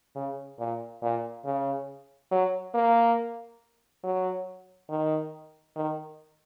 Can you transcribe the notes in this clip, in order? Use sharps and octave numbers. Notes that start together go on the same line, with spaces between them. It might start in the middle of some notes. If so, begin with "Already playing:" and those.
C#3
A#2
A#2
C#3
F#3
A#3
F#3
D#3
D#3